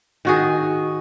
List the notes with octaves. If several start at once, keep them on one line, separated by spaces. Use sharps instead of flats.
D#3 F#4 G#4